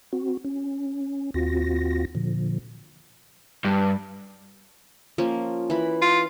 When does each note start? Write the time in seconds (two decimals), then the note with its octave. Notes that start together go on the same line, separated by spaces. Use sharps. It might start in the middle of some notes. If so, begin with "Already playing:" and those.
0.13 C4 F#4
0.44 C#4
1.34 D#2 C4 F4 F#4 A#6
2.15 A#2 D3 F3
3.65 G2
5.18 F3 A#3 C#4
5.70 E3 B5
6.02 F4